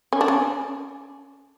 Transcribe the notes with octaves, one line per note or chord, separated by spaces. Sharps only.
C#4
D4
C#4